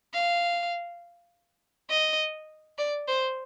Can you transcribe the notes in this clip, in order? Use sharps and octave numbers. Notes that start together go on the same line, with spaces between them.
F5
D#5
D5
C5